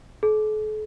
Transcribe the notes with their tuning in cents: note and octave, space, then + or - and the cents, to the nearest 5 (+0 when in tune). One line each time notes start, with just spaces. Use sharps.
A4 -45